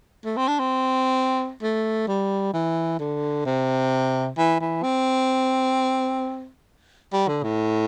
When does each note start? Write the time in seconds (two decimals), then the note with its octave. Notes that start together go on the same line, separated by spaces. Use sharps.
0.25 A3
0.37 C4
0.48 D4
0.59 C4
1.62 A3
2.08 G3
2.53 E3
2.99 D3
3.45 C3
4.38 E3
4.60 E3
4.83 C4
7.13 G3
7.28 D3
7.43 A2